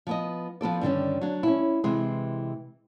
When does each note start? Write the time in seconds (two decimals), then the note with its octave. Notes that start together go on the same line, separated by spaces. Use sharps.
0.07 F3 B3 D#5
0.61 F3 B3 A4 D5
0.81 G2 D3 D#3 C#4
1.21 F#3 D4
1.43 C#4 E4
1.84 C3 E3 G#3